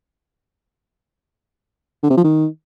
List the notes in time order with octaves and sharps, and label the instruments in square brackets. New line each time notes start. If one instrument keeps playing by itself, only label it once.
[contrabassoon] D3
C3
F3
D#3